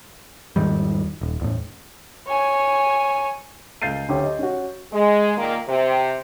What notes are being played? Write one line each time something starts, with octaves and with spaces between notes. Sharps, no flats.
E2 G#2 D#3 G3
D#1
E2 A2
C#5 G#5
C#2 F5 G6 A6 C7 D#7
D2 D3 C#4 G4
D#5
C#4 F#4
G#3
A#2 D#3 A#3
C3